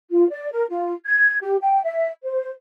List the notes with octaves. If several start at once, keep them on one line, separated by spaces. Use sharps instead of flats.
F4
D5
A#4
F4
G#6
G4
G5
E5
C5